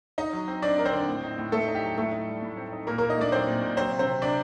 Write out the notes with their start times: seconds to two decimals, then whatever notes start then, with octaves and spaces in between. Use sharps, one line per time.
0.18 D#4 D#5
0.33 F#3
0.48 C4
0.62 C4 D4 D5
0.78 D#4 A#4
0.85 C4 C5
0.93 D3
1.08 A2
1.23 D#4
1.38 A2
1.52 A3 D#4 A4
1.68 D#4
1.75 G4
1.83 F#3
1.98 A2 A3 A4
2.12 D#4
2.27 G3
2.42 A2
2.57 C4
2.72 D#4
2.87 A#2 A#3 A#4
2.98 A#3 A#4
3.02 A#2
3.10 D#4 D#5
3.17 A3 D4 D5
3.32 F#3 C4 C5
3.47 A#2
3.62 A#2
3.77 F#3 C4 C5
3.92 C3
3.99 C4 C5
4.07 C3
4.22 C3 D4 D5